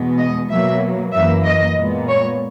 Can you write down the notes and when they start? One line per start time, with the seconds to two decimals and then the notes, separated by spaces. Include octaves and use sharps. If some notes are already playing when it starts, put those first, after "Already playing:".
Already playing: E2 B2 G#3 B3
0.19 D#5
0.50 B2 F#3 A#3 E5
1.13 F#2 E3 A#3 E5
1.45 D#5
1.77 A#2 G#3 B3
2.09 C#5